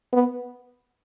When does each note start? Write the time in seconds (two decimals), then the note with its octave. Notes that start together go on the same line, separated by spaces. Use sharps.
0.13 B3